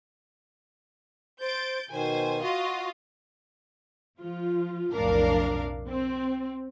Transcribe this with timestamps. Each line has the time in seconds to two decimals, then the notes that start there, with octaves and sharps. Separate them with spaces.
1.41 C5 G6 A6 D7
1.91 B2 D#3 C5 G#5
2.42 F4 F#4 D#5 F5
4.19 F3 F4
4.93 B1 F2 A2 D4 A#4 F5
5.89 C4